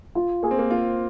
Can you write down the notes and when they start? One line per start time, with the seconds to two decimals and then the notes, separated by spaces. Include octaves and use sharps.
0.15 F4
0.43 A#3 G#4
0.51 C4
0.59 A#3
0.71 C4 F4